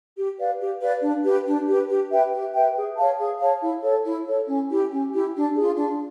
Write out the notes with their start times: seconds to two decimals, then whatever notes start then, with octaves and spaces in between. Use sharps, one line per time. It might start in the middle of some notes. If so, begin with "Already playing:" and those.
0.17 G4
0.38 B4 D5 F5
0.59 G4
0.82 B4 D5 F5
1.02 D4
1.25 G4 B4
1.46 D4
1.68 G4 B4
1.90 G4
2.10 B4 E5 G5
2.33 G4
2.54 B4 E5 G5
2.75 G#4
2.97 C#5 F5 A5
3.19 G#4
3.40 C#5 F5 A5
3.61 E4
3.83 A4 C#5
4.05 E4
4.26 A4 C#5
4.48 C#4
4.69 E4 G4
4.91 C#4
5.13 E4 G4
5.35 D4
5.56 F4 G#4
5.76 D4